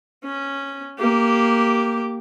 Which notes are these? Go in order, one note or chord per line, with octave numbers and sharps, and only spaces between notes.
C#4
A#3 G4